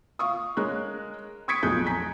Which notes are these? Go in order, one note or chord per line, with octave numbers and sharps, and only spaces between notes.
F5 C#6 D#6
G#3 A#4 C#5 F#6
C#6 D#6 G#6 B6 C#7 D7
B1 F2 A3 G#4 F#6 G6
G#5 A#5 B6